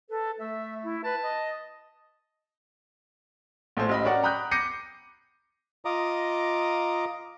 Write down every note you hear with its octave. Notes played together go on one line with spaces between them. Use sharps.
A4 B4
A3 E5
E4
B4 A5
D#5
A#1 A2 A4 C5
A1 D#5 B5
C#4 F#4 A#4 C#5 D5 F#5
G5 A#5 B5 D#6 F#6 G6
D6 G6 A#6 C7 C#7 D#7
F4 D#5 A#5 D6 D#6